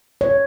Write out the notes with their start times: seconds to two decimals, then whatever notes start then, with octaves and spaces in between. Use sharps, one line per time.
0.21 C#5